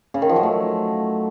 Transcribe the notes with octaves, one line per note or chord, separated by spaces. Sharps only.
C#3
D#3
F3
F#3
A3